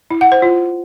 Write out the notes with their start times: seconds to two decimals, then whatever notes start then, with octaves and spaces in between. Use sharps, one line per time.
0.11 E4
0.21 F#5
0.32 C5
0.42 F4